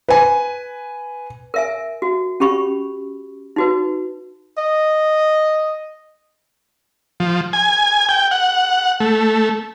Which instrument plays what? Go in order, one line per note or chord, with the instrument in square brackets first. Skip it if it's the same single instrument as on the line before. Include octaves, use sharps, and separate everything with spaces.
[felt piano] B4 G#5
[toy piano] A#4 E5 G#5
F#4
C#4 G4 B5 C#6
D#4 F#4 B4
[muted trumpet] D#5
[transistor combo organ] F3
G#5
G5
F#5
A3